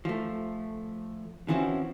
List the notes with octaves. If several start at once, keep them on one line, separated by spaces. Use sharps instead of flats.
F3 A3
E3 F3 C4 C#4 E4 F#4